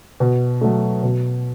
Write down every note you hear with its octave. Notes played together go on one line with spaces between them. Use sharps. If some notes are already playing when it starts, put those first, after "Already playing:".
B2
F#3 A3
B2